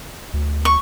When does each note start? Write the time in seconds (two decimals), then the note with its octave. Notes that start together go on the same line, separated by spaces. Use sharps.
0.34 D2
0.65 C#6